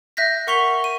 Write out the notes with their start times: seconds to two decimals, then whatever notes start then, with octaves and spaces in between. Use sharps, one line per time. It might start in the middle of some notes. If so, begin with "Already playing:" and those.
0.17 E5 F#6 G6 A#6 B6
0.47 A#4 F#5 C#6 B6 F7 G7
0.84 D#7